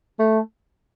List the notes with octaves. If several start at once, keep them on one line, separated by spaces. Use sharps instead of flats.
A3